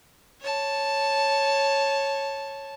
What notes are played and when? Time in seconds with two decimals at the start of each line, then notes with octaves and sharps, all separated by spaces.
0.40 C#5 A5